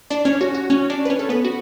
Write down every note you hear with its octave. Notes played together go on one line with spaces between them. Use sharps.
D4 D5
C#4 C#5
F#4
F#4
C#4 C#5
D4 D5
B4
C#4 C#5
A4
B3 B4
F#4